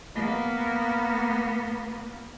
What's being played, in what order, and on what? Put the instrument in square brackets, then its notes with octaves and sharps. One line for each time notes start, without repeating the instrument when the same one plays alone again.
[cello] A#3 B3